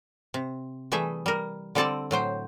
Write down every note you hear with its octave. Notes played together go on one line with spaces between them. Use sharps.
C3
E3 G3 A3 G#4 E5
G3 A#4
D3 G3 C4 A4 D5 A5
A2 F#3 C5 G5